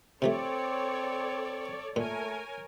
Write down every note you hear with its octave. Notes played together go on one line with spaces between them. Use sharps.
C3 F3 A3 C4 A4 C#5 D5
A#2 A3 A#4 C#5 G#5